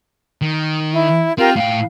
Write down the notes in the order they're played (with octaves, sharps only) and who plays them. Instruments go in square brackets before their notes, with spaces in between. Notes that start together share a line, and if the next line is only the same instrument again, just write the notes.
[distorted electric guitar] D#3
[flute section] E4
[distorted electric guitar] C4 [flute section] F4 G4 A#4
[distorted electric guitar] A2 G5 [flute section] F5